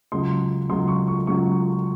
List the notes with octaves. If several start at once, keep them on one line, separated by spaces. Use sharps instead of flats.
C#2 C#3 F#3 C6
C#2 C#3 F#3 C6
C#6
C#6
C#2 C#3 F#3 C#6